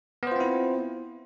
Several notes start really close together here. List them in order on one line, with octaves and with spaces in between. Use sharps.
B3 C5 F4 C4 E4